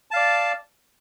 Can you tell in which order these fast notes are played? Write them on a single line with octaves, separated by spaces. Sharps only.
A5 F5 D5